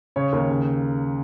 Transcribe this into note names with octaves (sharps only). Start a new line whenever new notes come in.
C#3 C#5
D#2 A#4
C#3